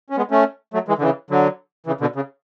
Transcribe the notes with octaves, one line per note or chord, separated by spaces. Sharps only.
C#4
G#3 B3
A3 C#4
F#3 A3
E3 G#3
D3
C#3 E3
D3 F#3
C#3 E3
B2 D3
C#3